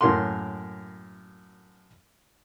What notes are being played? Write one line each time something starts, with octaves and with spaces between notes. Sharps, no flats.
F#2 A2 A#3 A#4 F#5 C6